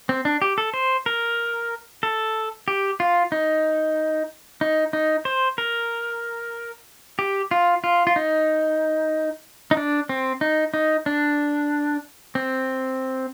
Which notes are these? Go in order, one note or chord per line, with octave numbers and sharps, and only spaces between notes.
C4
D4
G4
A4
C5
A#4
A4
G4
F4
D#4
D#4
D#4
C5
A#4
G4
F4
F4
F4
D#4
D#4
D4
C4
D#4
D#4
D4
C4